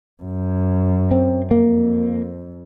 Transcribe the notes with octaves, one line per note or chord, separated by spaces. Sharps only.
F#2
C4
F2 A#3